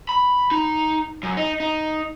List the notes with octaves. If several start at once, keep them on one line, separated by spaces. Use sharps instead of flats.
B5
D#4
F#2
D#4
D#4